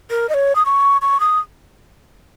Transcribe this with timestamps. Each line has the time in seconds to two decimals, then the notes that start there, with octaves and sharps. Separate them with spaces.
0.10 A#4
0.29 D#5
0.34 C#5
0.55 D#6
0.66 C#6
1.02 C#6
1.20 D#6